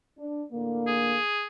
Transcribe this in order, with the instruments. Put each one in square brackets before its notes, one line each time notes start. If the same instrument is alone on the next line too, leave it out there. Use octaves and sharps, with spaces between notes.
[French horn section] D4
A2 D3 A#3
[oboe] G#4